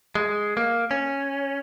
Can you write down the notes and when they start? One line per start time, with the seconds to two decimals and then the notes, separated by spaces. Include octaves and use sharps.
0.15 G#3
0.57 A#3
0.91 C#4